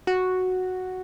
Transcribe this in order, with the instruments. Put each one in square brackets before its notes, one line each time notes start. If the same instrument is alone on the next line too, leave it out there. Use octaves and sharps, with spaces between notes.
[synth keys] F#4